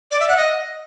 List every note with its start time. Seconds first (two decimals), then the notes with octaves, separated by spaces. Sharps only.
0.11 D5
0.20 E5
0.29 F#5
0.37 D#5